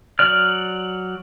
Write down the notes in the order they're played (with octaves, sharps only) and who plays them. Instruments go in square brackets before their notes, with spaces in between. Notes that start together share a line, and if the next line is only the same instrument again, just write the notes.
[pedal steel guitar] F#3 D5 F6